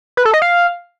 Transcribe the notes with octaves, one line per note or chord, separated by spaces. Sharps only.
B4
A4
D#5
F5